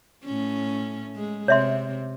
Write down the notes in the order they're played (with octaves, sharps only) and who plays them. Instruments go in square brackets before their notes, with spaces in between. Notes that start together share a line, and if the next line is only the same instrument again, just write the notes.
[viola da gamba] A2 C#4
G#3
[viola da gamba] C3 [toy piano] C#5 E5 C6